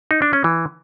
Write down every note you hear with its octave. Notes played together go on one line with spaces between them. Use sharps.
D#4
D4
C#4
E3